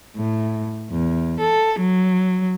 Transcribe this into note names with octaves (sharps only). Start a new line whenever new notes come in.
A2
E2
A4
F#3